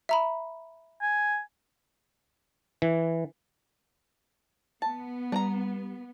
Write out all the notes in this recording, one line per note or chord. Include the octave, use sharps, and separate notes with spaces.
E5 A#5 B5
G#5
E3
B3 A5
G3 D4 A#5